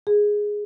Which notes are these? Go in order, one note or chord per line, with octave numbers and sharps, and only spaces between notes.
G#4